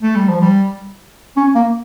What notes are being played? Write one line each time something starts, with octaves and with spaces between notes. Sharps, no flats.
A3
G3
F3
G3
C#4
A#3